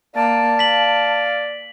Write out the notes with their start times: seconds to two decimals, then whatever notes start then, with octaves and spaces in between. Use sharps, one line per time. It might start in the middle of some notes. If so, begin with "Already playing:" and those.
0.16 A#3 D5 A5
0.59 F5 B6 F#7